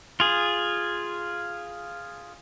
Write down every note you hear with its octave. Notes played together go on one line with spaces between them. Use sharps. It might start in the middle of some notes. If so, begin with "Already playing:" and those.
F4 G#4